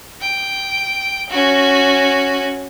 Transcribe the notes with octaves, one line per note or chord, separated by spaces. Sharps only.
G5
C#4 F#4